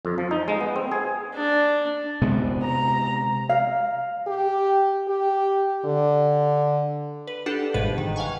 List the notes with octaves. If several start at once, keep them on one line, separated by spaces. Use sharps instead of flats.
F2
F3
D#4
G#3
B3
C4
G#4
D4
C3 G#3 B3
A#5
F5
G4
G4
D3
B4
D4 G4 A4 F#5
G1 G#2 B2 B4
D#3
F5 F#5 G#5 C#6